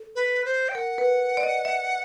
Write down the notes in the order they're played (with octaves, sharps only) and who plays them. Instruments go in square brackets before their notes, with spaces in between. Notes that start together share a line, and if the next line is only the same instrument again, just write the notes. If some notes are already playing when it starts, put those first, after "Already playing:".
Already playing: [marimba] A4
[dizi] B4
C5
G5
[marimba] A#4 [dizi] F#5
[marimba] B4
D5
D#5
E5